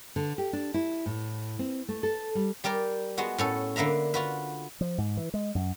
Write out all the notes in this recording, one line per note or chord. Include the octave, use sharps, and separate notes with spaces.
D3
G4
D4
E4
A2
C4
A3
A4
G3
G3 G4 A#4 D5
G#3 B3 F#4
A2 C#4 A4
D3 A#3 B4 E5 A#5
F4 F#4 B4
F3
G#2
E3
G#3
F#2